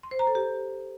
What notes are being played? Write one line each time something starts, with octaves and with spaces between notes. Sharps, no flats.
C6
C5
A#5
A4
G4